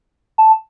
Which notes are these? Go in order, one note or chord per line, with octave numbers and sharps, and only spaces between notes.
A5